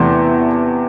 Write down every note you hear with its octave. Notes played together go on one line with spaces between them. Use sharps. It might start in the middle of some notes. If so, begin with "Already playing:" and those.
Already playing: E2 C3 E3 A3 C6